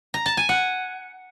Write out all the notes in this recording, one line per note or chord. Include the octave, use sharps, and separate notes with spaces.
A#5
A5
G#5
F#5